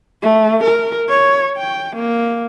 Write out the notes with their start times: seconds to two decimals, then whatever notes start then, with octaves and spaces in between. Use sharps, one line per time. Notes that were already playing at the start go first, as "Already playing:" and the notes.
0.22 A3
0.64 A#4
1.09 C#5
1.58 G5
1.96 A#3